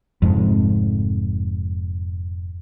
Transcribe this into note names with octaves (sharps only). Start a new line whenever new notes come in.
F1 F2 G#2